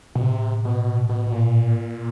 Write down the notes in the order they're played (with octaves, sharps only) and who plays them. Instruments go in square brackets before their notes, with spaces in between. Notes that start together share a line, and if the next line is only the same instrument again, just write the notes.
[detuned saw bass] B2
[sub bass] A2 [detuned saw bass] C3
[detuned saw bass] B2
B2
B2
A#2